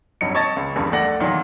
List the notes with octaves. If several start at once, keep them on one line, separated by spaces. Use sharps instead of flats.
F1 G2 F#3 D#4 C#7
C#5 D#5 A5 A6
C#2
F#1 E2 G2 C#3
A#1 A3 D5 F#5 A#6 F#7
E2 A#2 D#3 F#3